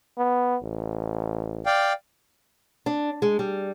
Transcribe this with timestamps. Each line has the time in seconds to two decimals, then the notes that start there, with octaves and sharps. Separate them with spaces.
0.18 B3
0.62 A1
1.66 D5 F5 G5
2.86 D4
3.22 G#3
3.39 G3